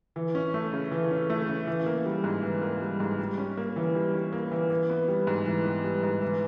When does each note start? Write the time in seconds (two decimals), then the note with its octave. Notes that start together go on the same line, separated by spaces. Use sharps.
0.16 E3
0.35 C#4
0.54 A3
0.73 C#3
0.92 E3
1.11 C#4
1.30 A3
1.48 C#3
1.67 E3
1.86 A#3
2.06 G3
2.24 G#2
2.43 E3
2.62 A#3
2.81 G3
3.00 G#2
3.19 G3
3.38 C#4
3.57 A#3
3.76 E3
3.95 G3
4.14 C#4
4.33 A#3
4.51 E3
4.70 E3
4.89 B3
5.08 G3
5.27 G#2
5.47 E3
5.65 B3
5.84 G3
6.03 G#2
6.22 E3